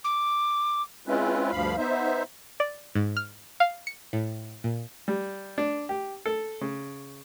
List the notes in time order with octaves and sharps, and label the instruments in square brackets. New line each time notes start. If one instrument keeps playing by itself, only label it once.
[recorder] D6
[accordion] G#3 C4 C#4 E4 F4 B4
D2 G2 F3 F5 B5
B3 D#4 C5 E5
[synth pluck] D5
G#2
F6
F5
C#7
A2
A#2
[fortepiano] G3
D4
G4
A4
C#3